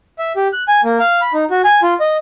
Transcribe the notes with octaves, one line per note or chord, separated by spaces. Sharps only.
E5
G4
F#6
G#5
A#3
F5
B5
D#4
F#4
G#5
F4
D#5